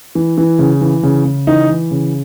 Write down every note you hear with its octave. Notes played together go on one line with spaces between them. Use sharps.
E3
E3
C#3
E3
C#3
C#3
E3 D#4
E3
C#3